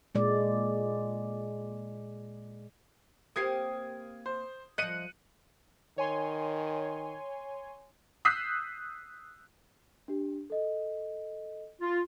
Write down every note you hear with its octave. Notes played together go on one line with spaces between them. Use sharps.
A#2 G#3 D5
A#3 C4 G4 D#6 G#6 C7
C5
F3 D#5 F#6 C#7 D#7
D#3 C#5 G#5 C6
D#6 E6 F#6 G6 B6 C7
D4 G4
A4 D#5
F4